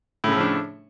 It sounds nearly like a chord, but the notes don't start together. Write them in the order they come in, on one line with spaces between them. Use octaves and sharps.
A2 C#3 A3 F3 D4